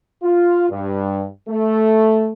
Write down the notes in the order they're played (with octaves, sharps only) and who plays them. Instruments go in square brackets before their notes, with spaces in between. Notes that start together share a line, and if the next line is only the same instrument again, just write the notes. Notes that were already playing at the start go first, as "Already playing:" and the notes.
[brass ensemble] F4
G2
A3